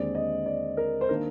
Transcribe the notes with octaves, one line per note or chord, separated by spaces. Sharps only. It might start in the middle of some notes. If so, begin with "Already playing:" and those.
Already playing: D#2 D3 G#3 C4 D5
D#5
D5
A#4
C5
D#3 A#3 D4 A#4